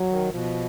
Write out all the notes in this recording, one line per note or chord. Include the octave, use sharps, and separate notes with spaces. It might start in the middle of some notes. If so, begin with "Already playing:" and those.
Already playing: F#3
D#3
B2 F3